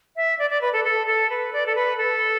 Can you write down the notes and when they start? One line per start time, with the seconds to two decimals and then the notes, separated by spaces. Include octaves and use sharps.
0.16 E5
0.39 D5
0.50 D5
0.61 B4
0.73 A4
0.84 A4
1.07 A4
1.29 B4
1.53 D5
1.66 A4
1.75 B4
1.98 A4